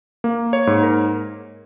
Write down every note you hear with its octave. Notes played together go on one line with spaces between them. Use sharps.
A#3
C#5
G#2
A#4